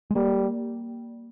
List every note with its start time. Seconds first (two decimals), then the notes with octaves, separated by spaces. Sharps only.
0.11 G#3
0.15 G3 A#3